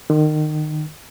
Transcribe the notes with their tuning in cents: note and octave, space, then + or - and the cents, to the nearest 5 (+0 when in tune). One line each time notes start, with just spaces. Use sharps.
D#3 -25